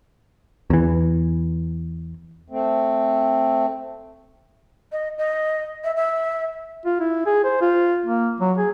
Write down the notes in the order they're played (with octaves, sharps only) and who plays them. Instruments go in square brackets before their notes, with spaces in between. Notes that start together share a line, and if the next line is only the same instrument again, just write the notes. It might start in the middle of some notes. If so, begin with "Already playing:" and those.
[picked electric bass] E2 E3
[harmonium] A3 C4
[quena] D#5
D#5
E5
E5
[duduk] F4
E4
G#4
C5
F4
A#3
F#3
G#4